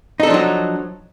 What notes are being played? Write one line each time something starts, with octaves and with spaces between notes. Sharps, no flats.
F3 F#3 D4 D#4 A4